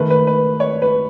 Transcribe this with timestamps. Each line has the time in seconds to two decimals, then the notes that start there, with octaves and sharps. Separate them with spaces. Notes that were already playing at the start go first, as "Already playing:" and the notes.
Already playing: D#3 A3 B4
0.10 B4
0.27 B4
0.60 C#5
0.82 B4